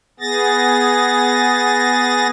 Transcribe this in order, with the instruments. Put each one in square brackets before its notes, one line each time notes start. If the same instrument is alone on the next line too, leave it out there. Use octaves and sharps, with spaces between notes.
[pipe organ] B3 G#4 A6 A#6